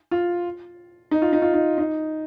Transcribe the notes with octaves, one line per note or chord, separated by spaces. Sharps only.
F4
D#4
F4
D#4
F4
D#4
D#4